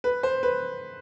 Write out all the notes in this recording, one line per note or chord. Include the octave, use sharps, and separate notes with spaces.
B4
C5
B4